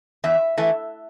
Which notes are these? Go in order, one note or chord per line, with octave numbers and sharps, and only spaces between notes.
E2 E5
E3 A3